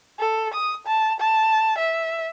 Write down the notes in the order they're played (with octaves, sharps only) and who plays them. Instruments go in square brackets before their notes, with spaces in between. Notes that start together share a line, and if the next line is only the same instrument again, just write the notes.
[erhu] A4
D#6
A5
A5
E5